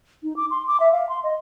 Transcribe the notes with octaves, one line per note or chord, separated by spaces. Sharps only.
D#4
D6
C6
D6
E5
F5
C6
D#5